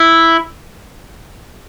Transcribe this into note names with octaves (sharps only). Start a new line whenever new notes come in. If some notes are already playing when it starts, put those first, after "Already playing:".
Already playing: E4